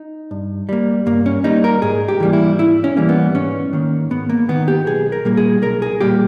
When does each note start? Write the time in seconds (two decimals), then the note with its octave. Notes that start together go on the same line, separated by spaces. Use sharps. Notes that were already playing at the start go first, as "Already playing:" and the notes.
Already playing: D#4
0.31 G2
0.69 G3 A#3
1.06 G2 A#3
1.26 C#4
1.44 G3 A#3 D#4
1.64 A#4
1.82 G#2 G#4
2.08 G4
2.20 E3 G3 A#3
2.33 E4
2.59 G#2 E4
2.84 C#4
2.97 E3 G3 A#3
3.09 B3
3.35 G#2 C#4
3.73 D#3 A#3
4.10 G#2 B3
4.30 A#3
4.49 D#3 A#3 B3
4.68 G4
4.86 B1 G#4
5.12 A#4
5.25 A#2 G3 A#3
5.37 G#4
5.62 B1 A#4
5.82 G#4
6.00 A#2 G3 A#3 G4